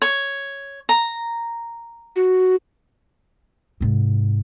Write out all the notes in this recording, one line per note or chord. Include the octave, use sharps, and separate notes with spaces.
C#5
A#5
F#4
G#2 C3